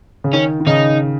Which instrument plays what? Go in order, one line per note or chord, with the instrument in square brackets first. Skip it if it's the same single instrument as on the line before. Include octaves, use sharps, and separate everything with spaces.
[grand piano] C#3
[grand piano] D#3 [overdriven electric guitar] C#4
[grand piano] D#3
[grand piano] C#3 [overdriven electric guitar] D#4